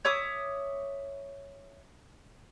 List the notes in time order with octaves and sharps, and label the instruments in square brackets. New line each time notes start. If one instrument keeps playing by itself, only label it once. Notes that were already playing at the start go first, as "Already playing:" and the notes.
[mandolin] C#5 E5 D6 D#6